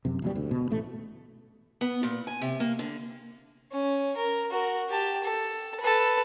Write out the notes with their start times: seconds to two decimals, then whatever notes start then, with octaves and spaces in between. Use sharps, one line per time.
0.05 F#2 C3
0.22 E1 B2 G3
0.36 D2
0.51 B2
0.71 A1 A3
1.81 B3
2.03 A#2
2.27 G#5
2.41 C3
2.60 A#3
2.79 D3
3.71 C#4
4.16 A#4
4.51 F#4 A#4
4.90 G4 A5
5.24 A4
5.80 A4 B4